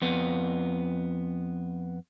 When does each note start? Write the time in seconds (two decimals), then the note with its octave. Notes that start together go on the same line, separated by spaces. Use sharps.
0.02 F2 B3